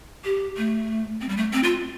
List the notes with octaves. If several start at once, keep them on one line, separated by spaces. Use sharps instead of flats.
G4
A3
C4
G3
A3
C4
F4